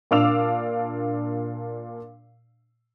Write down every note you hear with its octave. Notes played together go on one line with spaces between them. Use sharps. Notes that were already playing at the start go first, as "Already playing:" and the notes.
A#2 D4 F5 D6 E6 F7